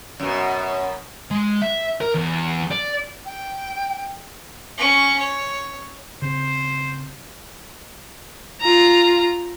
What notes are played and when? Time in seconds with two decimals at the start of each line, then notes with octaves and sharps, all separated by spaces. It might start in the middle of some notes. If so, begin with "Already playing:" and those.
0.20 F#2 B2
1.31 G#3
1.62 E5
2.01 A#4
2.15 E2
2.71 D5
3.25 G5
4.77 C#4 C#6
5.19 C#5
6.22 C#3 C4 C5
8.61 F4 A#5